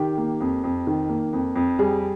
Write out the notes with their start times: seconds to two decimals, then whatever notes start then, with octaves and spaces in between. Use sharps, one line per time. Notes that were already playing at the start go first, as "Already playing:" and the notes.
Already playing: D#3 G4
0.17 A#3
0.41 F2
0.64 F2
0.87 D#3
1.09 A#3
1.33 F2
1.56 F2
1.79 G3 G#4